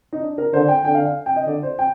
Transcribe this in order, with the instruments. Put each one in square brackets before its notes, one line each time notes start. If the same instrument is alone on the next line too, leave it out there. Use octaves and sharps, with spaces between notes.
[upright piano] D#4
D4
A#4
[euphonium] D3 [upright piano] C5
[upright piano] G5
[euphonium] D3 [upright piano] G5
[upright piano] F5
F5
G5
D#5
[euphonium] D3 [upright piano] D5
[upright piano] C5
G5